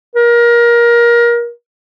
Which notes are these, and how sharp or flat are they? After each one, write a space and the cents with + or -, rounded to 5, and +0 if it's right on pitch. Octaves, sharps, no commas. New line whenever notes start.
A#4 +25